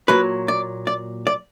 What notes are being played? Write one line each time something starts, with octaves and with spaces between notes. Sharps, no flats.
A#2 F#3 B4
D5
D5
D5